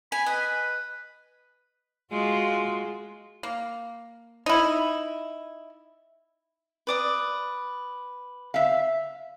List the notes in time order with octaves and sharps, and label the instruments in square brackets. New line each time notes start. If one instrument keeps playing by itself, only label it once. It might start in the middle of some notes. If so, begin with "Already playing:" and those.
[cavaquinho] G#5 [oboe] B5
[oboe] B4 [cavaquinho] D#5
[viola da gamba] G#3 F4 F#4
[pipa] A#3
D#4 E4
[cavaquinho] B4 D5 D#6
[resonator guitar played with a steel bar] E5 F5